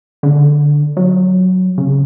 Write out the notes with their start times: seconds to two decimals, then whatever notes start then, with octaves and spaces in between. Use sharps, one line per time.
0.23 D3
0.97 F#3
1.78 C#3